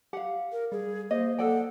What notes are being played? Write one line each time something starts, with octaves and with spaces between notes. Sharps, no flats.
G4 F5 F#5
A#4
G3 G#4
A#3 C5 D#5
A4 D5 F#5 G5